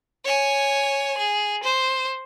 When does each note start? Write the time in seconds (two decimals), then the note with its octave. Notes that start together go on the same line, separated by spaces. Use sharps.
0.24 C#5 G#5
1.18 G#4
1.63 C5